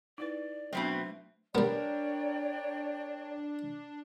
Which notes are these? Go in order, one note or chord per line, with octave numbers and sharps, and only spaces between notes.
D#4 E4 B4 D5
B2 F#3 A3 B3 C4 D4
G3 B3 D4 A#4 C#5 D5 G5